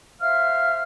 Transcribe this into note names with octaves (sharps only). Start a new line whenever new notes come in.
C5 E5 F5 F6